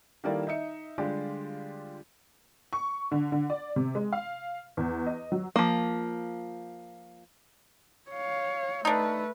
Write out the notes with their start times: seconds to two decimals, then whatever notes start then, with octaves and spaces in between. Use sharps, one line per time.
0.24 D#3 G3 A#3 E4 A4 D5
0.47 D#4 D#5 E5 C#7
0.98 D3 G3 G#3 F4 G4 D5
2.73 C#6
3.12 D3
3.32 D3
3.50 D5
3.76 C3
3.95 G#3
4.13 F5
4.77 E2
5.06 D#5
5.32 F#3
5.56 F3 A#3
8.10 C#5 F5
8.85 A3 D4 D#4 B4